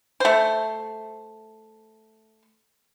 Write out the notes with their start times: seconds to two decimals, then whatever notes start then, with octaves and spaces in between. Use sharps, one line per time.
0.20 A3 C5